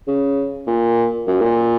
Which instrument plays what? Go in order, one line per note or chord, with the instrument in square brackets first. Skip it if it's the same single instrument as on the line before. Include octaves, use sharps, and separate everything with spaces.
[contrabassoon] C#3
A#2
F#2
A#2